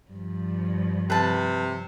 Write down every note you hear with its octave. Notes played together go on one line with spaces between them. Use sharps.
G2 F3
C3 B4 A5